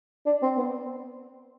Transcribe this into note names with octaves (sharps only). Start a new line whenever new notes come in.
D4
C4
B3